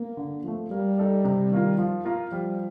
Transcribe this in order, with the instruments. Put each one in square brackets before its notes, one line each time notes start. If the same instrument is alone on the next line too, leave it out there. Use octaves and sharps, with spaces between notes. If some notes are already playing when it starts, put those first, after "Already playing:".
Already playing: [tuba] A#3
[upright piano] D3
F3 A3
[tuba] G3 [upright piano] A#3
[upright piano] D#4 A4 D5
C3
D#3 A#3 F4
F3
A#3 F4 A#4
[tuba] F3 [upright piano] G3